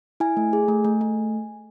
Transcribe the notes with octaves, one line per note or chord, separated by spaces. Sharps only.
E4 G#5
A3
G#4
A3
A3
A3